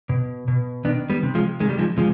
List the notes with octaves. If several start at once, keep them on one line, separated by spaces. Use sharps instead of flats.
B2
B2
D#3 B3 D4
G3 B3
C3
F3 G#3
D#3 G#3
G3
F3 G#3
C3 F3 G#3